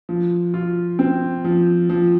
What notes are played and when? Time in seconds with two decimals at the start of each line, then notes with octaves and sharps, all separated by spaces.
0.09 F3
0.54 F4
0.99 C4
1.45 F3
1.90 F3